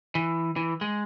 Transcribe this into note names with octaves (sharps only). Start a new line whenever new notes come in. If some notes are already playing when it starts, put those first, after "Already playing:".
E3
E3
G#3